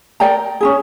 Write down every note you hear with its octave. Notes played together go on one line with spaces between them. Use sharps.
A#4 D5 G5 A#5
C#4 E4 G#4